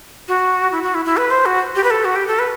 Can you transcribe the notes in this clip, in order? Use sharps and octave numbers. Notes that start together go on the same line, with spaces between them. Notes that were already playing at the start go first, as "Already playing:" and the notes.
F#4
E4
F#4
E4
E4
B4
C5
F#4
G4
B4
A4
F#4
G4
A4
B4